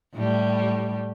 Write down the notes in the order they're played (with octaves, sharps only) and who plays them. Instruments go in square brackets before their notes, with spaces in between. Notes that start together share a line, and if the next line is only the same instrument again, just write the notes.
[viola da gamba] A2 G3